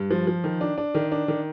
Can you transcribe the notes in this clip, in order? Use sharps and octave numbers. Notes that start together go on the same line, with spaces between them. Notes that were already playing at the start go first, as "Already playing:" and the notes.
Already playing: G2
F3
F3
D#3
D4
D4
D#3
D4
D#3